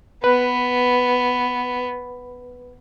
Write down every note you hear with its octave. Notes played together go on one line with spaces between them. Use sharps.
B3 B4